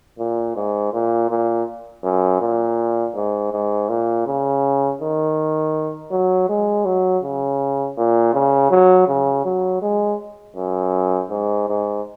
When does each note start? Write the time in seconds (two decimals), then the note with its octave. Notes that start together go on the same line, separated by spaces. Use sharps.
0.19 A#2
0.56 G#2
0.93 A#2
1.30 A#2
2.04 F#2
2.41 A#2
3.15 G#2
3.52 G#2
3.89 A#2
4.26 C#3
5.01 D#3
6.11 F#3
6.49 G#3
6.85 F#3
7.23 C#3
7.97 A#2
8.33 C#3
8.70 F#3
9.08 C#3
9.45 F#3
9.82 G#3
10.56 F#2
11.30 G#2
11.68 G#2